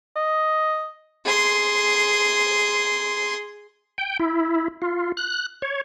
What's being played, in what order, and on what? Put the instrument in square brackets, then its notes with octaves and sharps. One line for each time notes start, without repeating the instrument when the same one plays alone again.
[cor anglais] D#5
[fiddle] G#4 C6
[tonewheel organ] G5
E4
F4
F#6
C#5